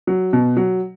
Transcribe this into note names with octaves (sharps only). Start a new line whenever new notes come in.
F#3
B2
F#3